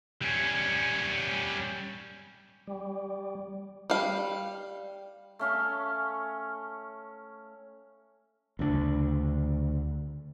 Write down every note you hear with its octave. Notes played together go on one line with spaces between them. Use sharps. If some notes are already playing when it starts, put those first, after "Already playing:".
G3 C#4
G3
G3 F5
A3 C#4 F5
D2 C#3 G#3 D4